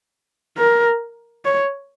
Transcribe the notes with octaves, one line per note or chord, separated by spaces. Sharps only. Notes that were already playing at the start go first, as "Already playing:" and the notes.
A#4
C#5